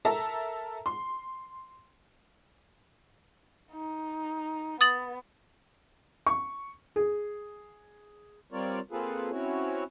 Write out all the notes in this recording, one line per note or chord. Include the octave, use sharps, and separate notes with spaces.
A4 A#4 E5 A5 A#5
C6
D#4
B3 D#6 A6 F#7
C#6
G#4
G3 C4 F4 A#4 C#5 D5
A#3 C4 F4 G#4 A4 B4
C4 C#4 E4 F#4 C#5